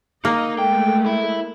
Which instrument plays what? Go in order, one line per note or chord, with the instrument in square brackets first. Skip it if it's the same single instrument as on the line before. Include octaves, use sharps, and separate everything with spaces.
[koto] A#3 [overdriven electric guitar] D#4 [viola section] D#5
[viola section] G#3 A3 [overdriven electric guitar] G5
[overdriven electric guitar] E4